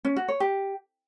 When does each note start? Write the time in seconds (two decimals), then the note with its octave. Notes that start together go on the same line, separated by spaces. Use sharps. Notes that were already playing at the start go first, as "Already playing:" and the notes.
0.05 C#4
0.16 F#4
0.28 C#5
0.40 G4